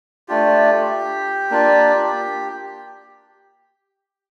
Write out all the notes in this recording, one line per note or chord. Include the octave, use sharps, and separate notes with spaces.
A3 D4 F4 G4
A#3 D4 F4